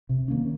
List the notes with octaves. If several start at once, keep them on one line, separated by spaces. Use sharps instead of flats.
C3
D#3 A#3 C#4